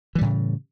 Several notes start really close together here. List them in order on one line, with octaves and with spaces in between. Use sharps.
E3 G3 A2 C#3